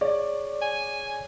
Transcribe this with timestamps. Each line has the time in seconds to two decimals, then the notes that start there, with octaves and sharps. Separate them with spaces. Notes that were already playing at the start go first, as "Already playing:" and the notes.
0.01 G#4 C#5 D5 C#6
0.62 G#5